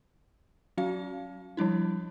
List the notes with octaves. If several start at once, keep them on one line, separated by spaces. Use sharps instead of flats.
F#3 C#4 F#4 F5
F3 G3 D4 E4